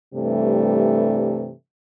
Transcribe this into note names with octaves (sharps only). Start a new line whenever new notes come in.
G2 C3 E3 G3 A3